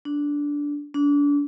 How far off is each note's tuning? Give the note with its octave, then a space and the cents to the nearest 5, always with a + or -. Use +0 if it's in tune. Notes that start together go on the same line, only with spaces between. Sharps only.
D4 -15
D4 -35